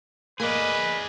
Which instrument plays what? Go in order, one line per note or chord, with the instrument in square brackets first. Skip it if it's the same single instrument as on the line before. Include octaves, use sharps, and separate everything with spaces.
[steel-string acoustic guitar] A#3 [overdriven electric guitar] G#4 D5 [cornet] B4 [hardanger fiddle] D#5